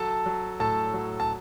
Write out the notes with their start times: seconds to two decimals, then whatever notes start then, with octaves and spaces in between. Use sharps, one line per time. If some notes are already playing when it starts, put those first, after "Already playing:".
Already playing: F#3 A4 A5
0.26 F#3
0.59 A2 A4 A5
0.94 F#3
1.20 A5